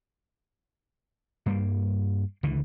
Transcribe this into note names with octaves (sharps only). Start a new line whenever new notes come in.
G2 G3 A#3
C#2 D3 E3